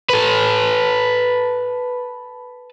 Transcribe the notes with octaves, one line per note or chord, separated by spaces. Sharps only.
A4 B4